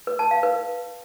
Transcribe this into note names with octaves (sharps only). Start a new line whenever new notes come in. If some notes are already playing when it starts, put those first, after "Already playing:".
B4
A5
F5
B4